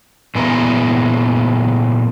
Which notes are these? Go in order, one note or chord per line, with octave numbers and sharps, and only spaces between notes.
A#2 E3 G#3 B3 A#4